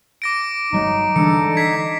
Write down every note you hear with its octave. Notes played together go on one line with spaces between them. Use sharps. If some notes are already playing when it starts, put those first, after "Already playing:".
D6 A#6 D7
G1 F#3 G#3 D#4
D3 E3 G3 G#3 A4 C#7
G#6 B6 C7